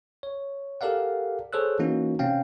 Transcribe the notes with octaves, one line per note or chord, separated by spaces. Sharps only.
C#5
G4 A4 A#4 D5 F5 F#5
G#4 A4 C5 C#5 E6 F#6
E3 A#3 C#4 D#4 F#4
C3 C4 C#4 F5 G5